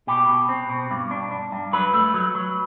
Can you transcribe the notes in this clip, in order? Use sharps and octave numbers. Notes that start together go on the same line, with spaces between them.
B2 G4
B2
C4
B2
G2
D4
D4
G2
F#3 B4
A3
F#3
F#3